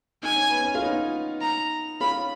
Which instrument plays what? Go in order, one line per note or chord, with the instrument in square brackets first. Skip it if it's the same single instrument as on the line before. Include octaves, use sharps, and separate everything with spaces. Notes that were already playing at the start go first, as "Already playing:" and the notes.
[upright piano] D#4 [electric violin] G#5
[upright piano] C#4
B3
C#4
F4
B3 D#4
[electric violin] A#5
[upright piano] C#4 F4 [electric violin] B5